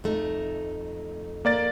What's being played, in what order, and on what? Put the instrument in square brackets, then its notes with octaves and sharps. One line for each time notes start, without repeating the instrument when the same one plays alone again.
[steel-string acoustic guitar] F2 A3 D#4
[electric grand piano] A#3 D5 A6